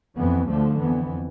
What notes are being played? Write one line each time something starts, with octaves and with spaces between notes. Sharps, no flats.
F2 E3 B3
D2 D3 F3 A3
F2 E3 B3